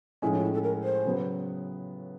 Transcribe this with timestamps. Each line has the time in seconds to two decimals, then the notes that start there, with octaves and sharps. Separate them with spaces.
0.22 A2 F3 G#3 C#4 E4
0.33 D#4
0.39 F4
0.43 E4
0.54 A4
0.63 A#4
0.84 C5
1.05 C#3 F#3 B3